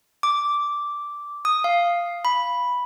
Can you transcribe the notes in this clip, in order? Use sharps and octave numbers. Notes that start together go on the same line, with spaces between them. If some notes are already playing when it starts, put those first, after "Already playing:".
D6
D#6
F5
B5